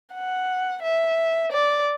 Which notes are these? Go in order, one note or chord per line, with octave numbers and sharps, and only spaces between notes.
F#5
E5
D5